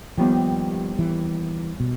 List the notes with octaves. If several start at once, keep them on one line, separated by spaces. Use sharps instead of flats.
D#2 D#3 F3 G3 B3
E3
B2